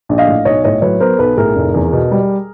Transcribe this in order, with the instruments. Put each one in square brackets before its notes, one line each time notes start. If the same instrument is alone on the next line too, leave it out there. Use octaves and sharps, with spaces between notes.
[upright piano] A#1
D#5 F5
A2
B1 C#5 D#5
A2 C#5 D#5
F#3 B4 C#5
B3 A#4 C5
B1 A4 B4
A2 G#4 A#4
F1
E2
B2
G3